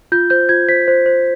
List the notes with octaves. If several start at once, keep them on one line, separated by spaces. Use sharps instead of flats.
F4 G6
C5 G6
F4 G#6
C5 B6
C5
C5